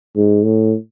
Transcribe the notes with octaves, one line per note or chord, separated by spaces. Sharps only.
G#2
A2